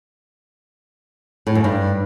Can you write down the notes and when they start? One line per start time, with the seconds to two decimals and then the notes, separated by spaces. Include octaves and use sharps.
1.47 A2
1.55 F#2
1.64 G2